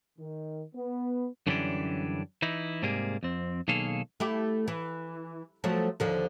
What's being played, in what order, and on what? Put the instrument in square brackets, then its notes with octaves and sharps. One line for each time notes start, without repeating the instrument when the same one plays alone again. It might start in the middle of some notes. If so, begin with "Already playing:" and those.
[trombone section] D#3
B3
[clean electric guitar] F#2 D3 E3 G3 C#4 D4
E3 D#4 E4
G#2 C3 G3 A#3 G#4
F2 C4
B1 D#3 A#3 G#4 A4 F5
[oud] A3 E4 G4
E3
F3 F#3 A3
D#2 D3 F3